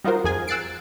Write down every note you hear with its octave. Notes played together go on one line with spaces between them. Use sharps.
G3 D#4 F4 F#4 A#4 C5
F2 G#4 G#5
E6 F#6 A6 C7 D7